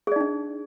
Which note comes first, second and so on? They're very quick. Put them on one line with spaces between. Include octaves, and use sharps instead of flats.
G#4 D5 D#4 D4